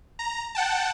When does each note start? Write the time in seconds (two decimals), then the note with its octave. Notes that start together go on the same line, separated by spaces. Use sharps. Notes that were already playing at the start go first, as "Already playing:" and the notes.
0.19 A#5
0.55 F#5 G5 A5